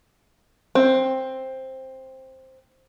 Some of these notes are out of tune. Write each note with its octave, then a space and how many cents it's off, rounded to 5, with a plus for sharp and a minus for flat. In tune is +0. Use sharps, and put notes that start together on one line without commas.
C4 +10